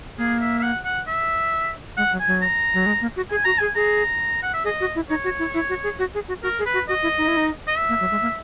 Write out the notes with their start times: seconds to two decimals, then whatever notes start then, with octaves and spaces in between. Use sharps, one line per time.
0.18 A#3 G#4
0.41 E5
0.59 E5
0.63 F#5
0.85 F#5
1.07 E5
1.97 G#3 F#5
2.12 F#3
2.20 G#5
2.27 F#3
2.42 A#5
2.74 F#3
2.86 G#3
3.02 A#3
3.16 F#4
3.31 G#4 G#5
3.45 F#4 A#5
3.58 G#4 G#5
3.75 G#4 A#5
4.42 F#5
4.54 E5
4.64 G#4 D#5
4.80 F#4
4.95 E4
5.10 D#4 C#5
5.24 F#4
5.39 E4
5.54 E4
5.69 F#4
5.83 G#4
5.99 F#4
6.14 G#4
6.28 F#4
6.43 F#4 A#4
6.59 G#4
6.66 B4
6.74 F#4
6.88 F#4 D#5
7.03 E4
7.18 D#4
7.28 E4
7.37 D#4
7.67 D#5
7.77 E5
7.89 A#3
8.00 F#3
8.11 G#3
8.22 A#3